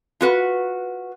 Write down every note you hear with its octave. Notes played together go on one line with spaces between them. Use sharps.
F4 F#4 B4